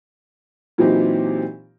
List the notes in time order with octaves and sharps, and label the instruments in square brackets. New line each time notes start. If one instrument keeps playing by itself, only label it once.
[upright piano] A#2 E3 F#3 C4 D#4 G4